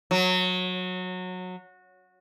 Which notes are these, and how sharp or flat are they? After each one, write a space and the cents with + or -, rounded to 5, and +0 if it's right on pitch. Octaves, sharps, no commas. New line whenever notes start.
F#3 -20